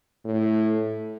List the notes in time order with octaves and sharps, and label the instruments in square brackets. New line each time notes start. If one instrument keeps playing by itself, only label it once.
[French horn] A2